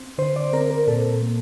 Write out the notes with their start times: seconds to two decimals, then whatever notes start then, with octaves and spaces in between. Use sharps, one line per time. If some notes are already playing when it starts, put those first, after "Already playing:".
Already playing: C4
0.18 D3 C5
0.36 D5
0.53 C4 A#4
0.71 A#4
0.87 A#2 A4
1.22 A#3